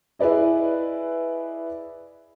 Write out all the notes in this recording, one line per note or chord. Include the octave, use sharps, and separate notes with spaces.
E4 G#4 B4 D5 D#5